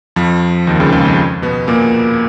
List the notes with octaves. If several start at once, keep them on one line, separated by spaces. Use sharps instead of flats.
F2 F3
D#2 D#3
C#2 C#3
C#2 C#3
F2 F3
B2 B3
A#2 A#3